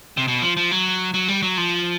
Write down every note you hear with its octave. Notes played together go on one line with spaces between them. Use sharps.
C3
B2
F3
F3
F#3
F#3
G3
F#3
F3